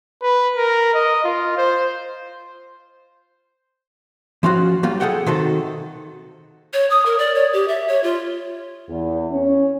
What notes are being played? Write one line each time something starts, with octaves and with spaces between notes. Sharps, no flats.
B4
A#4
D#5
F4
C5
F3 C#4 F4 F#4
F#3 G3 A#3 F4
G#4 A4 C#5 F#5 G5
C3 D#3 F#4 A4
C#5
D#6
A#4
D5
C#5
G4
E5
C#5
F4
E2
C#4